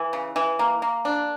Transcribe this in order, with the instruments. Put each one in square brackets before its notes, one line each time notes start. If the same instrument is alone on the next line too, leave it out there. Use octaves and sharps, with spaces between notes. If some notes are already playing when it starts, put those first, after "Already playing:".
Already playing: [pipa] E3
C#3
E3
A#3
A#3
D4